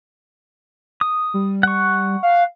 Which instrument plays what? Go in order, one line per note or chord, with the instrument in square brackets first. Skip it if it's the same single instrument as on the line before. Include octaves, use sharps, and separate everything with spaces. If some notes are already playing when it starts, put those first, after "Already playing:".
[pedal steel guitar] D#6
[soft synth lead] G3
[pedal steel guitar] F#5 C#6
[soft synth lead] F5